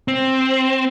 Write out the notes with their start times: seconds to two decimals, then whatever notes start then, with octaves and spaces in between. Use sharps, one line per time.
0.08 C4